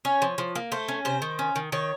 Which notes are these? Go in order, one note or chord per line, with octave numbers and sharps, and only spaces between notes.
C#4 C#5
F3
F3
A#3
A3 C5
C#4
C3 C5
D#3
C#4
D#3
D#3 C#5